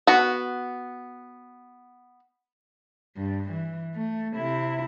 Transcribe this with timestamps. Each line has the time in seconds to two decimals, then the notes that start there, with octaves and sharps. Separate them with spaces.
0.07 B3 F#4
3.17 G2
3.51 E3
3.95 A3
4.36 C3 E4